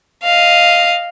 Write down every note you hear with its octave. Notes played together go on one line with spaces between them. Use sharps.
D#5 F5